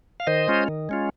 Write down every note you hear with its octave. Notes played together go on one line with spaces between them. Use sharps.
F5
D#3 C5 D#5
G#3 C#4 F4
D#3
G#3 C#4 F4